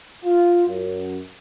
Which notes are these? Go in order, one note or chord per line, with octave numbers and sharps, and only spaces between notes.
F4
F#2